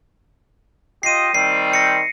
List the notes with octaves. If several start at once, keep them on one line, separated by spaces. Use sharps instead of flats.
F4 G4 D#5 C7 D#7
D#3 G3 C4 C7
A#6 C#7